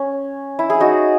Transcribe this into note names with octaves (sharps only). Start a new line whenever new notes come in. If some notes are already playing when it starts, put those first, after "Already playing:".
Already playing: C#4
E4
E4 G#4
D#4 F#4